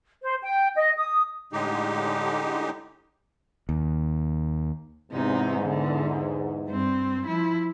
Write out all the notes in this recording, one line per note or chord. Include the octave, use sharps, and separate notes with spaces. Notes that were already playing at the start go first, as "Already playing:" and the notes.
C5
G5
D#5
D#6
A2 D3 G#3 D#4 G4
D#2
E2 G#2 C3 D#4
D3
G2 C4
F3 E4